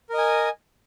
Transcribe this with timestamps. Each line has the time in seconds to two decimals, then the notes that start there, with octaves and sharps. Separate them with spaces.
0.09 A#4
0.14 D#5
0.18 G#5